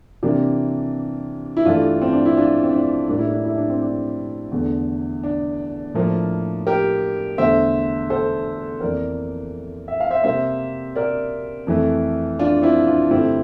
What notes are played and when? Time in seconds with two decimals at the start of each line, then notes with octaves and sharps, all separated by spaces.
0.23 C3 E3 A#3 D4
1.57 E4
1.65 G2 E3 A3 D4 F4
2.01 C4
2.13 D4
2.25 E4
2.37 D4 F4
2.63 C4
2.73 D4
3.08 A2 G3 A#3 D4
3.19 E4
3.30 D4
3.45 E4
3.57 D4
3.70 C4
3.82 D4
4.52 E2 D3 A3
5.23 D4
5.94 A2 F3 A#3
6.67 G4 A#4
7.38 E2 D3 A3 C5 E5
8.10 A4 C5
8.81 F2 E3 A#3 A#4 D5
9.88 E5
10.00 F5
10.10 C5 E5
10.24 C3 G3 A#3 C5 E5
10.96 A#4 D5
11.67 F2 E3 A3
12.39 D4 F4
12.62 C4 E4
12.86 D4 F4
13.10 G2 D3 A3 C4 E4